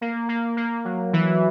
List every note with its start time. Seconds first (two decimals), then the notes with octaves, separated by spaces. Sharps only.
0.01 A#3
0.29 A#3
0.57 A#3
0.85 F#3
1.13 E3